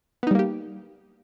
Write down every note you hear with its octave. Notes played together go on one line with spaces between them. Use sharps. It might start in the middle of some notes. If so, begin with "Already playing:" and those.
G3 A#3 B3 D#4 G4